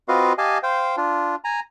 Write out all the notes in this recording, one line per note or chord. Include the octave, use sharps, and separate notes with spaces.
C4 F4 F#4 B4 D#5 F5
G4 D#5 F5 G#5 A5
C5 F5 G5
D4 F4
G#5 A#5